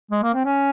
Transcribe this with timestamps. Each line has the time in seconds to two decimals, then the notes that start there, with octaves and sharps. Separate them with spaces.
0.11 G#3
0.23 A#3
0.34 C4
0.45 C#4